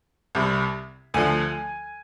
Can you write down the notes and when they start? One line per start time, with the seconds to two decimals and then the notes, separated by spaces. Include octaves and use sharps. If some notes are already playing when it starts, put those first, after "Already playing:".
0.35 C2 C3 G3
1.14 D2 D3 F3 G#5